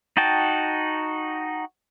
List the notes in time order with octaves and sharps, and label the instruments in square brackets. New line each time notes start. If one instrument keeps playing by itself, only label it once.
[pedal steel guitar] D#4 F#4 G5 A5